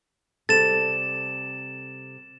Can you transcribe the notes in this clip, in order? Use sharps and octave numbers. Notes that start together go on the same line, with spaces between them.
C3 G3 A4 A6 E7